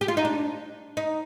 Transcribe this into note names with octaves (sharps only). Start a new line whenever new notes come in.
G4
F4
D#4
D4
D#4